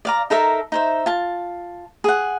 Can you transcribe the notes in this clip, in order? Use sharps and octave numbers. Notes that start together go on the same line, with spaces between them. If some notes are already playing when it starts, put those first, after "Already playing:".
D5 F5 A#5
D#4 A4 A#4 E5
D#4 C5 E5
F4 A5
G#4 F#5